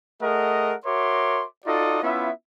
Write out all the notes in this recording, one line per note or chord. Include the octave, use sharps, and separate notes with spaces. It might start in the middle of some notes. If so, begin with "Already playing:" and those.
A3 G#4 A#4 D#5 F#5
F#4 A#4 C#5 E5 C6 D6
D#4 F4 F#4 A4 D5 D#5
B3 C#4 E4 F4 E5